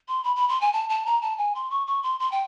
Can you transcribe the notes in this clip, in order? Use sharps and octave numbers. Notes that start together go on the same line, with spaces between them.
C6
B5
B5
C6
G#5
A5
A5
A#5
A5
G#5
C6
C#6
C#6
C6
C6
G5